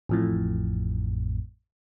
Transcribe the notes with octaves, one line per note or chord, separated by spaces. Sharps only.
A1 F2 A2